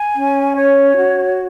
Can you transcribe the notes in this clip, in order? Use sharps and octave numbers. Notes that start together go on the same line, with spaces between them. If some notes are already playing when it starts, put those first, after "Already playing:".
Already playing: G#5
C#4
C#5
F#4